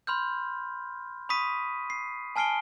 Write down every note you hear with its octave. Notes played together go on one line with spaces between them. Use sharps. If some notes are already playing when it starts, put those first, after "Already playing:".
B5 C6 F6 G6
B5 C#6 D#6 B6 D#7
C7
G#5 A5 F6 C7 D7 G7